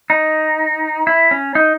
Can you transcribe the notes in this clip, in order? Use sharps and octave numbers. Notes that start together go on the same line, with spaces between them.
D#4
E4
C#4
D#4